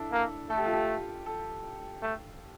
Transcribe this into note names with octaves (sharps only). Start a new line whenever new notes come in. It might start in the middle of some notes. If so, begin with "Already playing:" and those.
Already playing: D4 E4 A4
A#3
A3 A4
G4
F4
G4
A4
A3